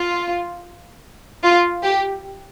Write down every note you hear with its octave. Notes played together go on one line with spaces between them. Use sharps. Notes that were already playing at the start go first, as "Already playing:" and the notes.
Already playing: F4
F4
G4